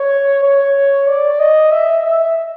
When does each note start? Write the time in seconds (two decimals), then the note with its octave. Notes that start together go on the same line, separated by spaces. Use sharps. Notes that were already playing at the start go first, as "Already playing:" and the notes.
Already playing: C#5
0.43 C#5
1.08 D5
1.40 D#5
1.72 E5
2.04 E5